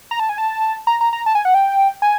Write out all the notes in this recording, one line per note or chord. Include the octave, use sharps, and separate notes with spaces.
A#5
A5
G#5
A5
A#5
A#5
A#5
A5
G#5
F#5
G5
G#5